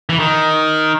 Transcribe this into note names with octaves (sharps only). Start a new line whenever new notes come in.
E3
D#3